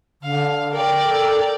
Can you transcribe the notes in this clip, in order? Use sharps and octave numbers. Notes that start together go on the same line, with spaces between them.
D3 F5
A#4 D5 G5
A4